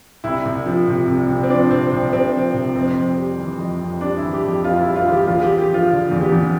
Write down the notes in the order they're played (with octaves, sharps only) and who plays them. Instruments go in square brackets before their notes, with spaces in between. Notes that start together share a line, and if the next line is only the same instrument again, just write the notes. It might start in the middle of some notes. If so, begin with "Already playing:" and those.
[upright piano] C2 E4
C2
F3
C3
C2
C2
C4
F3 D4
C3 C4
C2
C2 C4
F3
C3
F2 C4
F2
G3
E3
F2
F2
G3 D4
E4
E3
G4
F2 G4
F2 F4
E4
G3
F4
E3
G4
E2 F4
E2 G4
G4
F3
F4
D3
E2
G4
E2